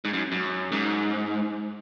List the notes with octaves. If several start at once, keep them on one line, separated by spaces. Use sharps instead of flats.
G#2
F#2
F#2
G#2